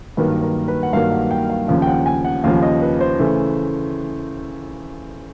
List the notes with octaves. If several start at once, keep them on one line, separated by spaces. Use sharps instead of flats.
G2 D#3 F#3 A#3 B4
A#4
B4
F#5
G2 D#3 F#3 A#3 F5
F#5
G5
F5
D#2 C#3 F3 F5
G5
F#5
G#5
F#5
D#2 C#3 F3 F5
D#5
B4
C5
C#3 E3 A3